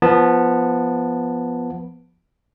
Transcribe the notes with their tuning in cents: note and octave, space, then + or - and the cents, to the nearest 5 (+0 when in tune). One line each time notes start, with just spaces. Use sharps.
F3 -15 B3 -10 A5 +5